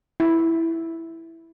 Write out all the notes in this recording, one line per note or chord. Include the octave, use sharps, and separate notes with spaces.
E4